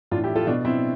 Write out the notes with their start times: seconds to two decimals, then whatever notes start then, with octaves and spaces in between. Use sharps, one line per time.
0.11 A2 D4 F4
0.17 E3
0.24 E4 G4
0.36 F4 A4
0.47 B2 D4 F4
0.65 C4 E4